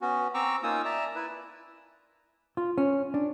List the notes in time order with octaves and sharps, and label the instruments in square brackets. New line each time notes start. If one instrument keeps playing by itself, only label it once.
[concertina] B3 C#4 F#4
C4 A#5 C#6 D6 E6
A#3 C#4 D#4 F4 D#6 E6
D5 E5 A5 A#5
E4 B4
[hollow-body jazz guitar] F4
C#4
D4